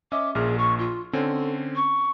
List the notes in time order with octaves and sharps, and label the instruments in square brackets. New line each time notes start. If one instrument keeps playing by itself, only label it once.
[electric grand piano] C#4 D#5 E5 [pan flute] D6
[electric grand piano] A#1 A#2 F6 [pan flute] G#4
[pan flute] C#6
F4
[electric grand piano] D3 C4 C#4 [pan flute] A4
[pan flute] C#6